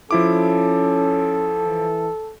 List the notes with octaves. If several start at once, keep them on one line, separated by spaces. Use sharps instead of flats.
F3 C#4 E4 A4 D6
E3